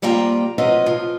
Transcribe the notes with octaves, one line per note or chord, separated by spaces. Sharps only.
C3 G3 A#3 F4 G5 A#5
C3 F#3 F4 B4 D#5
F3 F4